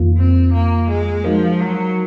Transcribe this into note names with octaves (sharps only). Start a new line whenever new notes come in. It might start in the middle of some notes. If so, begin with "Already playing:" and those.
Already playing: F2 D#3 A#3 F4
C4
A#3
G#3
F3 G#3 D#4 F#4 A#4
F#3